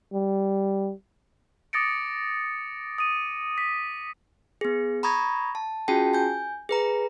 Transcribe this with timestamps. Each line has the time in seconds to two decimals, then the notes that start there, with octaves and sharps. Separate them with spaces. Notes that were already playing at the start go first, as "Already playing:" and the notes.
0.13 G3
1.73 D6 D#6 A6 A#6 C#7 D7
2.98 D#6 D#7
3.58 B6
4.61 B3 G#4
5.03 A#5 B5 C#6 D#6 G#6 A#6
5.55 A5
5.88 C#4 F4 F#4 G#4 G5 A5
6.14 G#5 G6
6.69 G#4 B4 A#5